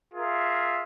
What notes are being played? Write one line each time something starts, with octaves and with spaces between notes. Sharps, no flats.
F4 G#4 A#4 E5